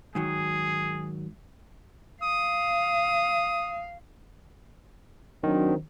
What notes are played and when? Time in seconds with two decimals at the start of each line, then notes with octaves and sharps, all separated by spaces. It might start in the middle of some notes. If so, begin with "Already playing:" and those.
0.15 G#2 D#3 F#3 G#4
2.22 F5 D#6
5.44 D#3 F#3 C4 D4